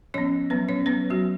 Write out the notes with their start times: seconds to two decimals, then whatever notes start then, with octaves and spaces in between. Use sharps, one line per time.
0.14 F3 B3 C#4 C#5
0.50 F#3 B3 B4
0.69 C#4 C#5
0.86 F#3 B3 B4
1.10 F#3 F#4